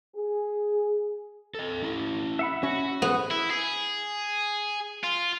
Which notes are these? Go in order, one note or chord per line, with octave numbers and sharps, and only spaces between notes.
G#4
A4 D#5
C#4 E4
E5 F#5 B5
C#4 F#4
G#3 B3 C5
E4
G#4
F4